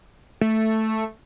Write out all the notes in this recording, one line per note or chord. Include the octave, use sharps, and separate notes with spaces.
A3